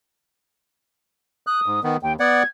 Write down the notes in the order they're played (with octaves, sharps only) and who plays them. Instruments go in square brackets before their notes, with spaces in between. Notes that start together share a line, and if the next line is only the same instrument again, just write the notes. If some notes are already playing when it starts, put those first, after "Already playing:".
[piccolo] D#6 [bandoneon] F#6
[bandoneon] G#2
D#3 B3
[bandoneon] D#2 [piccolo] G5
[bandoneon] B3 D5 F#5 [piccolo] G#6